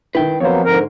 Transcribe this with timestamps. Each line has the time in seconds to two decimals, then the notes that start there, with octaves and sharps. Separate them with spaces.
0.15 D#3 E4 B4 G5
0.40 F2 F#3 A#3 B3 C5 C#5
0.65 G#2 D3 A#4